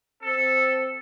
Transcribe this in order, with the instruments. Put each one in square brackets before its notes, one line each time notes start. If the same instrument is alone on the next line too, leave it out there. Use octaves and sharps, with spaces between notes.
[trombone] C4 [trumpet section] A4